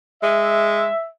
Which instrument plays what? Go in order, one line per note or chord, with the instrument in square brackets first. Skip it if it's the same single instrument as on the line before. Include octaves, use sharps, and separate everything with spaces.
[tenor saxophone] G#3 [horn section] E5